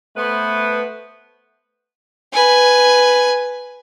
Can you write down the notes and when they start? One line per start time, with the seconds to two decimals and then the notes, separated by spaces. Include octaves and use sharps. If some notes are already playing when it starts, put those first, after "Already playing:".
0.17 A3 B3 B4 C5
2.33 B4 G#5